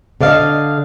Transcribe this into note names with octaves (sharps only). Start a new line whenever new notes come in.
D3 D5 D#5 F5